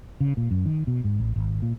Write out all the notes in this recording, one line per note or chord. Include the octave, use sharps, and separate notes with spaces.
C#3
A#2
F#2
D#3
B2
G#2
A1
G#1
A#2